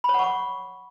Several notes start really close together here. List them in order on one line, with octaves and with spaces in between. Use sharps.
B5 C#5 F#5 C#6 D6